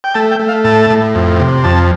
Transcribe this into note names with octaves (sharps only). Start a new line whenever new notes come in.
G5
A3 A5
G5
A3
F5
A2 A5
A2
F2
C3
F2 A5